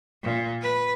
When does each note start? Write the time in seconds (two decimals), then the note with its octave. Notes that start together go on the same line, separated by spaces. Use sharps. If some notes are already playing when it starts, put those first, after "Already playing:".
0.24 A#2
0.62 B4